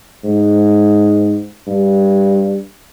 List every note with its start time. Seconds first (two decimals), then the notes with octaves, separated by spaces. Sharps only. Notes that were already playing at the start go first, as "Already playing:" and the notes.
0.24 G#2
1.67 G2